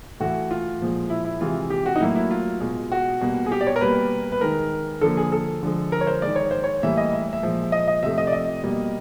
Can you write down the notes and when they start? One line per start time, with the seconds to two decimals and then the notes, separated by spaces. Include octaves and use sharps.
0.20 A2 E3 A3 F#4
0.51 F4
0.81 A#2 F3 G#3
1.10 E4
1.25 E4
1.41 C3 E3 G#3 F4
1.70 G4
1.86 F#4
1.96 D#4
2.00 A2 F#3 A#3 E4
2.16 E4
2.31 F4
2.60 B2 G#3
2.92 F#4
3.21 B2 G3 A#3
3.46 G#4
3.52 G4
3.61 D5
3.67 C#5
3.76 A#4
3.81 B2 G3 A#3 B4
4.32 B4
4.41 D#3 G#3 A#4
5.01 D3 F3 A#3 A4
5.17 G#4
5.32 A4
5.63 D3 F3 G#3
5.92 A#4
6.01 C#5
6.07 C5
6.22 D#3 G#3 D5
6.36 C#5
6.51 C5
6.64 C#5
6.82 A2 E3 G3 A#3 E5
6.97 D#5
7.13 E5
7.33 E5
7.42 A#2 F3 G#3
7.72 D#5
7.87 D#5
8.02 C3 F3 A3 E5
8.18 D#5
8.27 D5
8.32 D#5
8.64 B2 G3 A#3